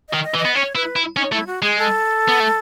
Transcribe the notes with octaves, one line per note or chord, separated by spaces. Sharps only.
D#3 D#5
D#5
E3
D#5
B3
C#4 C#5
E4 B4
E4
C#4 D#4
A3 E4
F#4
G#3 G#4
A4
B3
A3